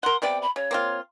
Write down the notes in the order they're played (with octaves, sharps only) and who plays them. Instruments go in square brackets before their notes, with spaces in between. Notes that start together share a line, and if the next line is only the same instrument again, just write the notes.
[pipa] A#4 F#5 [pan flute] C6
[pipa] C3 B3 D5 [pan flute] G5
[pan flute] B5
[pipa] C#3 [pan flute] C#5
[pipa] A#3 C4 F4